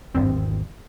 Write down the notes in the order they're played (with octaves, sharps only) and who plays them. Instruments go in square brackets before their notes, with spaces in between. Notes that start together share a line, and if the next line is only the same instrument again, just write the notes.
[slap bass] G#1 E2 [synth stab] G2 C4